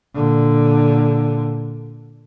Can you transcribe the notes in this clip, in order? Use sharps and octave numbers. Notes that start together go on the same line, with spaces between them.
A#2 D3